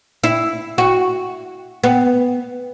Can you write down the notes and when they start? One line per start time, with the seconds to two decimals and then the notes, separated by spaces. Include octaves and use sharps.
0.24 E4
0.78 F#4
1.84 B3